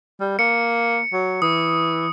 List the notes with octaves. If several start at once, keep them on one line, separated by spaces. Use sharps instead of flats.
G3
A#3 C#7
F#3
E3 D#6